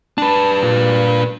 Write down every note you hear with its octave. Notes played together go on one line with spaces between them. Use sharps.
D4 B4 A5
A#2